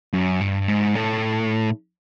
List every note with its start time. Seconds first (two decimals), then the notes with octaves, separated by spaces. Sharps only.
0.13 F#2
0.41 G2
0.68 G#2
0.95 A2